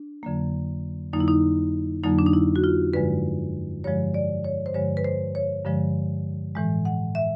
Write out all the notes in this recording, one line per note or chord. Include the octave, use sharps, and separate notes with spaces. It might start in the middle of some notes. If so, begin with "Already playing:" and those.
Already playing: D4
F2 D3 F#3 A#3
F2 D3 F#3 A#3 D#4
E4
D#4
F2 D3 F#3 A#3 D#4
D4
D#4
E4
F#4
F4
G2 D3 F3 G#3 B4
G2 D3 F3 G#3 C#5
D5
C#5
C5
G2 D3 F3 G#3 C#5
B4
C5
C#5
G2 D3 F3 G#3
A2 E3 G#3
F#5
E5